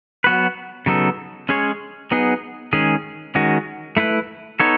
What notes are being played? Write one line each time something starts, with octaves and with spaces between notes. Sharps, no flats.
F#3 B3 F#4 B4
C#3 F#3 B3 D#4 A4
G#3 C#4 G#4 C#5
F#3 B3 D#4 G#4
D#3 G#3 C#4 G#4
D#3 G#3 C#4 F#4
A3 E4 B4
B3 D#4 A4 C#5